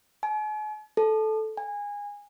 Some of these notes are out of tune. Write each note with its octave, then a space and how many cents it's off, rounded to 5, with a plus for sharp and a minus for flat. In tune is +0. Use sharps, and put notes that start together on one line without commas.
G#5 +45
A4 -10
G#5 -20